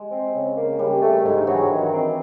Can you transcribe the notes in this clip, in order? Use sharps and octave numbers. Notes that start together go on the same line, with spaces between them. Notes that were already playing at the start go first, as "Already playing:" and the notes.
Already playing: G#3
C4
C#3
A#3
C#3 G3
A3
G#2 D3
E3 F#3
D#3
C4